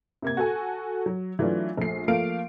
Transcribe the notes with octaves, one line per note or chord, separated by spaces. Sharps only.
C3 A#3 G#6
F#4 A4 G#5
F#3
E3 F#3 A3 D4 F4
A#1 A3 C7
F3 A3 A#3 F5 D7